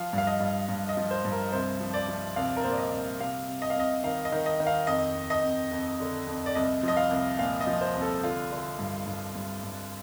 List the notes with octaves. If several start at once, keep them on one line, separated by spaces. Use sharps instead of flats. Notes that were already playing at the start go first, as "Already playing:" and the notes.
Already playing: F3 F5
G2
F5
D#5
G2
G2
D#5
F3
C5
G2
A#4
C2 C5
F3
D5
F3
C2 F5
A#4
A#2 C5
D5
D#5
C2
C3 F5
C3
D#5
F5
C2 D#5
D#3 F5
D#5
D#3
D#5
D#3
F5
F2 D#5
F2
D#5
F2
F2
D3
F2
D5
C2 D#5
F3 D#5
F5
C2
A#2 F5
D#5
F3
C5
C2
A4
D3 F4
D3
G2
G2
G2
G2